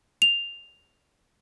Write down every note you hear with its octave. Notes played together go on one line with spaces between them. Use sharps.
F7